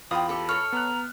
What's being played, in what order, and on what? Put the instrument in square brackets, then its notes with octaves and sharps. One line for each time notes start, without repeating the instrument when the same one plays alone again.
[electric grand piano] E2 F4 F5 [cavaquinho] G5 D#6 [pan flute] B5
[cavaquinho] G4 A4
[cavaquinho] A4 C#5 [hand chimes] F6
[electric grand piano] B3 F#6 [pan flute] A#5